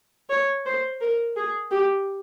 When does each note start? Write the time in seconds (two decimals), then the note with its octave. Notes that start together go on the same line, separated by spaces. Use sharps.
0.30 C#5
0.66 C5
1.01 A#4
1.37 G#4
1.71 G4